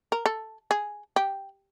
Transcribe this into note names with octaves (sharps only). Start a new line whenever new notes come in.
A#4
A4
G#4
G4